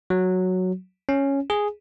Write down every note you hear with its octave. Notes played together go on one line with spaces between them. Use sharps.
F#3
C#4
G#4